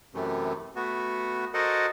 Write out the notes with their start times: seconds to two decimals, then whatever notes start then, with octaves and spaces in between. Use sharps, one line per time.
0.14 F#2 C3 E3 A3
0.76 A3 B3 F#4
1.54 F#4 A4 A#4 C5 D#5 F#5